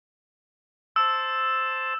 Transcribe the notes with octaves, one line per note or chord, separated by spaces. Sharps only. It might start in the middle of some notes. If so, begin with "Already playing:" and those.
C5 A5 E6